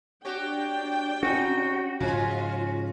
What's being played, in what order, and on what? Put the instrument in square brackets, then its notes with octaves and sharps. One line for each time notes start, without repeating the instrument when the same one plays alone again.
[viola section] D4 G5 [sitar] F#4 G4 C#5
[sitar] C3 D#4 [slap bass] C#4 [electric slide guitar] F#4
[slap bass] G#2 C#3 [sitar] F3 G#3 C#4 [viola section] F4